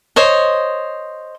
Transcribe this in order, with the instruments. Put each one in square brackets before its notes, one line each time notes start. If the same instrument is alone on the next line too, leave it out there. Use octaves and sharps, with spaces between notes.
[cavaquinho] C5 C#5 D#5